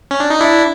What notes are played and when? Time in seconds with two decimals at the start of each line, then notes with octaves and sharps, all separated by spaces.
0.11 C#4
0.20 D4
0.30 D#4
0.40 D4 E4